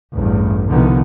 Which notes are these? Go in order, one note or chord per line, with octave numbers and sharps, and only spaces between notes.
A1 E2 G2
C2 B2 D3 D#3 F3 B3